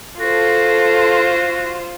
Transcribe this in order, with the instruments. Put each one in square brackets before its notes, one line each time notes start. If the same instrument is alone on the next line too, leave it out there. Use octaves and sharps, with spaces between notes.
[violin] F4 C5 [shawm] F#4 [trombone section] A4